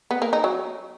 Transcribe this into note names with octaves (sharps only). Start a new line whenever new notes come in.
B3
A#3
D#4
F#3